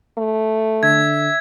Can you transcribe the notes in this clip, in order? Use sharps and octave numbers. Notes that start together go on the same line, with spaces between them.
A3
D3 E5 G#6